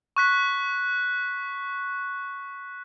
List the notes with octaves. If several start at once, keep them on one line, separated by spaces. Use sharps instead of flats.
C#6 F#6 B6